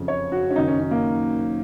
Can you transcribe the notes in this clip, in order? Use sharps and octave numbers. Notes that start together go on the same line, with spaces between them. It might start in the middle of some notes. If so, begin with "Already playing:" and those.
Already playing: F#1 F2 C#3
C#5
F#4
C#4
F#1 F#2 D#3 F#3 D#4
C#4
C#4
A#3